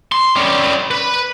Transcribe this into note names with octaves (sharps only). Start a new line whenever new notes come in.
C6
G3 C#4
B4 B5